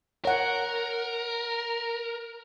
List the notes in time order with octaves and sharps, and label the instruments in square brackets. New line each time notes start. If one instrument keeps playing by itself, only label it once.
[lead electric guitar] A#4 [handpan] C#5 F#5